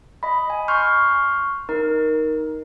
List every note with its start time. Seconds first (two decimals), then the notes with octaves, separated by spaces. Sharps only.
0.23 D#5 B5
0.50 G#5
0.68 C6 C#6 F6 G6
1.69 D#4 A#4